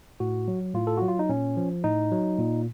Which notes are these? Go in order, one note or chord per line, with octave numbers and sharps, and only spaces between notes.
A2 F#4
F#3
A2 F4
A4
F#3 F#4
F4
D#4
A#2 C#4
F3
A2 D#4
F#3
A#2